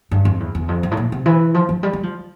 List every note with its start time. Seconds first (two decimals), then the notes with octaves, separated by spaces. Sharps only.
0.11 G2
0.25 F2
0.40 E2
0.55 E2
0.68 F2
0.83 G2
0.91 A2
0.97 A#2
1.12 C3
1.26 E3
1.54 F3
1.69 F3
1.83 G3
1.93 G3
2.03 F3